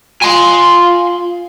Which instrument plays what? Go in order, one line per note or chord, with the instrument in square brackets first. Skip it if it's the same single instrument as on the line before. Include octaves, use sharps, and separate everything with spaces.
[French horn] F4 [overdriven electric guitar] G#5 C6